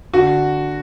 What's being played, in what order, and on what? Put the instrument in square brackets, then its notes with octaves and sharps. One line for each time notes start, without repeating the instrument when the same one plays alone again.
[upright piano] D3 F#4